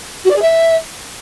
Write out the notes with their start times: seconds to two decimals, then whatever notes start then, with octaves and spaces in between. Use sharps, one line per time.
0.25 F#4
0.30 D5
0.36 G#4
0.42 E5